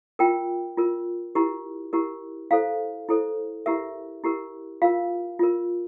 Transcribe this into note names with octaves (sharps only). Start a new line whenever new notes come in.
F4 A#4 G5
F4 A#4
E4 G4 A#4
E4 G4 A#4
E4 A4 C5 F5
E4 A4 C5
E4 G4 A#4 E5
E4 G4 A#4
F4 A#4 F5
F4 A#4